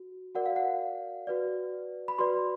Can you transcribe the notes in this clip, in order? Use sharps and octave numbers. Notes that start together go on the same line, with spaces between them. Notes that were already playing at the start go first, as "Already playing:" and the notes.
Already playing: F#4
F#4 A#4 D5 F#5
F5
F#5
F#4 B4 D5
B5
F#4 B4 D5 C6